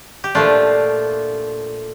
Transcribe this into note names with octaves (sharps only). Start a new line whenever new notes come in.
G4
A#2 F3 A3 D4 F4